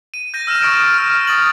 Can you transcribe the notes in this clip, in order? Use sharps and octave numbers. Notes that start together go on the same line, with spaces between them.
D#7
G6 A#6 D#7
E6 F6 A#6 E7 F7
C#6 D#6 A6 D7 E7
F6
D#6 A6 F#7